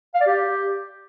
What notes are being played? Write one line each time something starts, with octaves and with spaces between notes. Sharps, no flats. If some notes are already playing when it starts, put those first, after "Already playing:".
F5
D5
G4